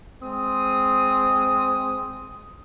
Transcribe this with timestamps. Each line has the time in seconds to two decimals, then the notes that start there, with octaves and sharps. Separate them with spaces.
0.23 G#3 C4 D#6